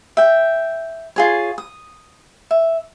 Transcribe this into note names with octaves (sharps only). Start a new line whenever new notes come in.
E5 G5
F4 G#4 C#5
D#6
E5